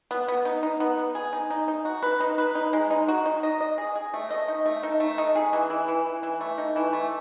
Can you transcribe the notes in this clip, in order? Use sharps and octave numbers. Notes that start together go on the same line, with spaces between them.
B3
B3
D#4
D#4
B3
B3
G#4
D#4
D#4
D#4
F#4
B4
D#4
B4
D#4
G#3
D#4
F#4
D#4
D#5
D#5
G#4
G#4
A3
D#5
D#4
A3
D#4
A3
D#4
G#4
E3
E3
E3
E3
E3
A3
D#4
E3
A3